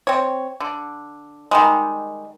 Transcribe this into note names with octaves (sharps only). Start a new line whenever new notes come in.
C4 C#5
D3
D#3 G3 G#3